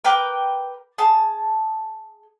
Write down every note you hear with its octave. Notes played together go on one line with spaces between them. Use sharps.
A#4 B4 G5 D6
G#4 A5